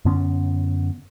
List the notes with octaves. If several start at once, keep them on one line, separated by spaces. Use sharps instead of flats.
F#2 D3 B3 C#4